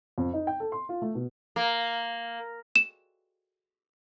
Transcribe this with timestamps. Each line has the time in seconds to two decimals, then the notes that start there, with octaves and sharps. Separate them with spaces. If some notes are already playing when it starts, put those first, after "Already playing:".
0.18 F2
0.34 D#4
0.47 G5
0.60 A4
0.72 C6
0.89 F4
1.02 A3
1.15 B2
1.56 A#3
2.76 E7